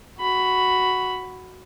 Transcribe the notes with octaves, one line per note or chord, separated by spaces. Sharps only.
F#4 B5